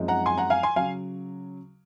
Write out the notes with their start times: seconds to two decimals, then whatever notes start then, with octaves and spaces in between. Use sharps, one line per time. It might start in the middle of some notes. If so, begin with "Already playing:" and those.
Already playing: F#2 F3 G#3 C4 D#4
0.08 F#5 A#5
0.26 G#5 C6
0.38 F#5 A#5
0.50 F5 G#5
0.63 G#5 C6
0.76 C#3 F#3 F5 G#5